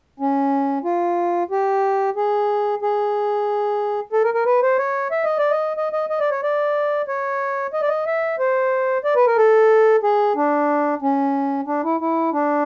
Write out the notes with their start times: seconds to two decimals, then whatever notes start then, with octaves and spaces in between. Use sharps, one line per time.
0.20 C#4
0.84 F4
1.51 G4
2.16 G#4
2.82 G#4
4.13 A4
4.24 A#4
4.34 A#4
4.45 B4
4.62 C5
4.78 C#5
5.11 E5
5.24 D#5
5.38 D5
5.51 D#5
5.77 D#5
5.93 D#5
6.10 D#5
6.20 D5
6.31 C#5
6.43 D5
7.08 C#5
7.73 D#5
7.81 D5
7.89 D#5
8.06 E5
8.39 C5
9.04 D5
9.16 B4
9.27 A#4
9.37 A4
10.03 G#4
10.36 D4
11.02 C#4
11.67 D4
11.84 E4
12.00 E4
12.33 D4